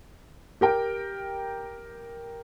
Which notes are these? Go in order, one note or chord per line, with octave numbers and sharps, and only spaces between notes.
G4 A#4 G5